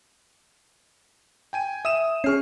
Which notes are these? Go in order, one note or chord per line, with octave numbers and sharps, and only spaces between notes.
G5 G#5 D#7
E5 D#6 D#7 E7
C#4 G#4 C#6 F6 C7